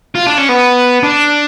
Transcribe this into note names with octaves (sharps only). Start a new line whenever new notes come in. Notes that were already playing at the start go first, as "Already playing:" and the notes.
F4
D4
C#4
B3
D4